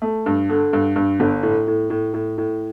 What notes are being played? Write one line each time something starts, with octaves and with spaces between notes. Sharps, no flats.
A3
G2
D3
G2
G2
G1
A2
A2
A2
A2
A2